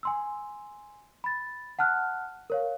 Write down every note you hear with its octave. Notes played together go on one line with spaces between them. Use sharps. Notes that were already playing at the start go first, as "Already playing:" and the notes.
G#5 C6 E6
B5 A6
F#5 A5 F6 F#6
A#4 C#5 F5